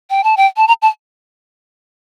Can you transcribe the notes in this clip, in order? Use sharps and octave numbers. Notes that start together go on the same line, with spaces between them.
G5
A5
G5
A5
A#5
A5